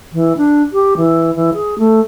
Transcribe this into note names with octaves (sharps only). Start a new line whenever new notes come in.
E3
D4
G4
E3
E3
G#4
A3